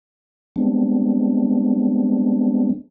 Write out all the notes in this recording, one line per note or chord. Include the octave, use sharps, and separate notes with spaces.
G3 G#3 B3 C4 D4